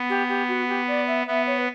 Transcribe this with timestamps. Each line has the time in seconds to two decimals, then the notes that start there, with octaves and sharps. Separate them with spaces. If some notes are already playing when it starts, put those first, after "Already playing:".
Already playing: B3
0.09 G4
0.29 G4
0.48 F#4
0.68 G4
0.87 D5
1.07 E5
1.27 B3 E5
1.46 C#5
1.58 B4